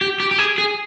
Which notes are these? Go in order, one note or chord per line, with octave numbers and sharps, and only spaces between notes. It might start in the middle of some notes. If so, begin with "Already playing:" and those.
G4
G4
G4
G#4
G#4